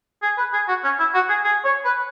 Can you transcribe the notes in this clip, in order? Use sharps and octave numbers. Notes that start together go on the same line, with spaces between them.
G#4
B4
G#4
F#4
C#4
E4
F#4
G#4
G#4
C#5
B4